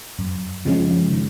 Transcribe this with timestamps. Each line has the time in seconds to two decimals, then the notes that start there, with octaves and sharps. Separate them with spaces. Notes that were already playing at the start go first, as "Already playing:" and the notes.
0.18 F#2
0.65 C#3 F3 G#3 C#4
1.12 D#3